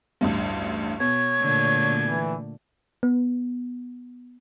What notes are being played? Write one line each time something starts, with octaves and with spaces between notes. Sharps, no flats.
A1 D2 G2
B2 C#5 G#6
A#2 D3 A3
E3
B3